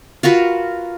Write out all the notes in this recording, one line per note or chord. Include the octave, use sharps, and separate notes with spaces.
F4 F#4 A#4 B4